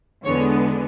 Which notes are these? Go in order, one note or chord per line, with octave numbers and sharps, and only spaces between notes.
E2 D3 G#3 B3 C#5